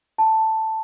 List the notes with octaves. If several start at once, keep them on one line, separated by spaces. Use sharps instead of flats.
A5